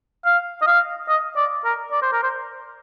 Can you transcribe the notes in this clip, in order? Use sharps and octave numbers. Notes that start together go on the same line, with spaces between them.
F5
D#5
F5
D#5
D5
A#4
D5
C5
A#4
C5